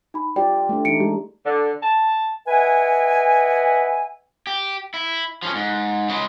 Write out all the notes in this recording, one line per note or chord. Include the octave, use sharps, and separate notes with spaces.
D#4 B5
F4 G4 D5 G5
A3 D4
E3 D#4 C#7 D7
G#3 G4
D3
A5
B4 D#5 E5 F#5 G#5
G4
E4
F3 C#4
G#2
C#3 G#3